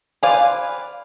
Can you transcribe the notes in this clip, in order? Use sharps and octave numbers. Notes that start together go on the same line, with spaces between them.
B4 C5 D5 F5 G#5 D6